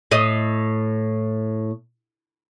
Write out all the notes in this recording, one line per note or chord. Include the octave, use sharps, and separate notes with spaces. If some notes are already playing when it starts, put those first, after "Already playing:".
A2 D#5